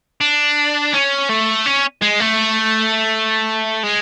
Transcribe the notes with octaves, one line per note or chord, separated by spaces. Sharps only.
D4
C#4
A3
C#4
G#3
A3
G#3